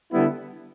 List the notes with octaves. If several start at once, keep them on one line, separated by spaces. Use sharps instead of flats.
D3 G3 B3 E4